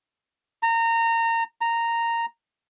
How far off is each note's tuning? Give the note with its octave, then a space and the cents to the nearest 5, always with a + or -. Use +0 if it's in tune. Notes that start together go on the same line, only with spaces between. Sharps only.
A#5 -25
A#5 -10